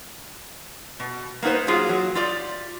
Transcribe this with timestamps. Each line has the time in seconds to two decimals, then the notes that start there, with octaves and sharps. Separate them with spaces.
1.00 B2
1.42 A#3 B3 D#4 B4 C5
1.67 F#3 A#3 F4 G#4
1.89 F#3
2.15 F4 G4 D5